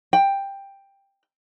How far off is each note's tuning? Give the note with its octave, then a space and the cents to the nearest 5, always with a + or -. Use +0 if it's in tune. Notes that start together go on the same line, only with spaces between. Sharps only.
G5 +10